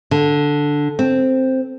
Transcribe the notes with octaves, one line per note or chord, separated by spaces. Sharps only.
D3
C4